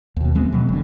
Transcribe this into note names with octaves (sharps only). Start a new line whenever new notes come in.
D#2 B2
E3 G#3 B3 C4
B2 F#3
F1 D3